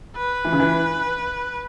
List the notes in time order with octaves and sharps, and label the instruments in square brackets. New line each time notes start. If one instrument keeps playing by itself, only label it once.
[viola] B4
[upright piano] E3
C#3
E3